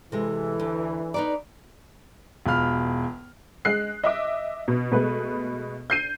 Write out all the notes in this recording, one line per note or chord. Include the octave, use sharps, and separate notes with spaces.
C3 E3 G#3 A4
D2
D#4 B4 D5 A#5
E1 B2 F4 B5 F6
G#3 F#6 C7
D#5 E5 D6
B2
B2 G#3 A3 B4
G6 C7 D#7